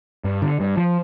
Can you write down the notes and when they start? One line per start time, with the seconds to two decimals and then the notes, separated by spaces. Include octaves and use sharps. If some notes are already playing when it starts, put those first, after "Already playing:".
0.24 G2
0.42 D3
0.60 G2
0.77 F3